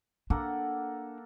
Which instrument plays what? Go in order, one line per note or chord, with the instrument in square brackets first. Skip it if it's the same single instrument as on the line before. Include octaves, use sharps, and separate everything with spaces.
[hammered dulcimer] A#3 A4 F#5 [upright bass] D4